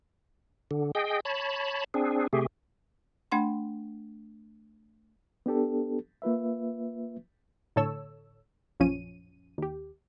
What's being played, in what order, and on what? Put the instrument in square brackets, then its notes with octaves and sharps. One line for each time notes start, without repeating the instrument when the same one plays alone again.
[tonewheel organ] D3
G#4 D#5 G5
C#5 A5 B5
C4 D4 G#4
C3 A3 G4 G#4
[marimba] A3 D4 F#5 B5 C6
[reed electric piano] B3 D4 G4 A4
A#3 F4 B4 E5
[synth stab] A2 D3 A4 C#5 E6
A#1 F#2 F3 C#4 D#7
D#2 G4